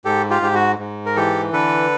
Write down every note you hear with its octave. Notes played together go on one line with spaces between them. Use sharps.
G#2 G4 A4
F4 G4
G#2 G4
F#4
G#2
A#4
E3 G4 A4
D3 A4 B4